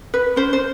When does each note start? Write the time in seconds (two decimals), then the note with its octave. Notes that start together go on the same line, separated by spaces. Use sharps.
0.14 B4
0.36 C#4 C5
0.53 C5